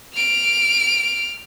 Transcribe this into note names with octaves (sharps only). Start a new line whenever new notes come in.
F6 D7